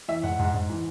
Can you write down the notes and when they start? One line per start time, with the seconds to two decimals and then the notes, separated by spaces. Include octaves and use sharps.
0.08 E3 E5
0.23 G#2 F#5
0.39 G#2
0.54 G#2
0.70 E3